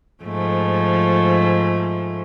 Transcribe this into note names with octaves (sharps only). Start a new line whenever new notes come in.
G#2 F3 A3